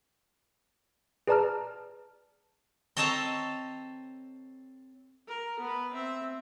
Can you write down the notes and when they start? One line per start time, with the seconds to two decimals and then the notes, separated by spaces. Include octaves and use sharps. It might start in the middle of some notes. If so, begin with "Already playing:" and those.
1.27 G#4 B4 D5 A5 A#5 F6
2.97 C4 A4 C#5 D#5 A5 A#5
5.28 A#4
5.59 B3 B4
5.92 C4 E5